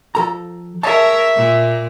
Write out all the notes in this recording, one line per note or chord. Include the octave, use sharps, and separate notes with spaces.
F3 A4 A#5
G#4 A#4 C#5 E5 A5
A#2